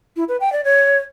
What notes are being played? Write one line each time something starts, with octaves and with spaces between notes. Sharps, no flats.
E4
B4
G5
D5
C#5